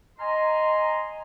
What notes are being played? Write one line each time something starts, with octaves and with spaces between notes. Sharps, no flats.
D#5 G#5 A#5 C6